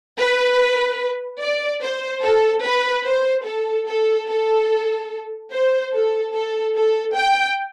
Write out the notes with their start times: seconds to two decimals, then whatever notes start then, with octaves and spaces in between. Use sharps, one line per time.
0.17 B4
1.40 D5
1.81 C5
2.23 A4
2.63 B4
3.05 C5
3.45 A4
3.87 A4
4.28 A4
5.51 C5
5.92 A4
6.34 A4
6.75 A4
7.15 G5